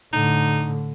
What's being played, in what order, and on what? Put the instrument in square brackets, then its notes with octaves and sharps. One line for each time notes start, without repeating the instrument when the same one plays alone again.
[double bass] A2 D3 [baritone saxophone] D#4